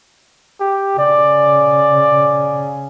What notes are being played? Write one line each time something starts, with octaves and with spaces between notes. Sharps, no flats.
G4
C#3 D5